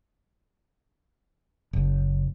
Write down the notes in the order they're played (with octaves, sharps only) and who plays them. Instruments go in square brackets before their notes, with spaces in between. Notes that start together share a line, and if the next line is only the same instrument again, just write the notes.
[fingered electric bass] F#1